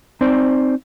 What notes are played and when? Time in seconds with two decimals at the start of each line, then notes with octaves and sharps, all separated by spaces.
0.21 C4 D#4 C5 D5